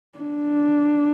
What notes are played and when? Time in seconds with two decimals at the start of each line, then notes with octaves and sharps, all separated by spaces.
0.19 D4